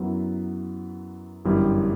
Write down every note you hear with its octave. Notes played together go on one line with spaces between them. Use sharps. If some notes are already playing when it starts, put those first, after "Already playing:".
Already playing: F#2 F#3 B3 E4
G1 F#2 E3 G3